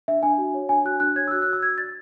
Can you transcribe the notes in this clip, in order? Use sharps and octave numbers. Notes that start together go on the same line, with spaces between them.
D4 E5
D4 G#5
F#4
C#5
D4 G#5
F#4 F#6
D4 F#6
C#5 G#6
E6
F#4 F#6
F#6
F#4
E6
F#4 G#6
D5 A6